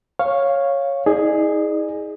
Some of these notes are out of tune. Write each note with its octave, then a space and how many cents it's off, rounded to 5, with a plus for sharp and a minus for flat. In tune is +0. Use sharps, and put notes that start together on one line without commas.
C#5 -5 F5 +0
D#4 +45 G#4 +0 D5 +45